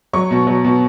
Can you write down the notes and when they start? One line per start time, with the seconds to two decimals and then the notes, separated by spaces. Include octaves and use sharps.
0.13 F#3 C#6
0.31 B2
0.47 F#3
0.64 B2